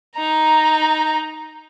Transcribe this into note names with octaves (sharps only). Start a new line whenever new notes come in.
D#4 A#5